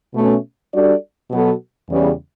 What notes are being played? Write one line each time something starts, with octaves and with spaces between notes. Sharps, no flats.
B2 A3 C#4
G3 D4 F#4 A4 D5
B2 F#3 B3 F#4 A4
E2 C#3 G3